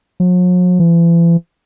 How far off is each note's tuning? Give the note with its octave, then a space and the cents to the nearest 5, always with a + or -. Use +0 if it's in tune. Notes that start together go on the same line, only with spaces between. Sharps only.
F#3 -45
E3 +40